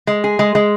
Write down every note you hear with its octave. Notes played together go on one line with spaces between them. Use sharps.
G#3
G#4
G#3
G#3